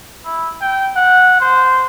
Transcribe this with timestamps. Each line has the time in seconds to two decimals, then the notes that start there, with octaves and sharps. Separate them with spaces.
0.25 E4
0.61 G5
0.96 F#5
1.40 C5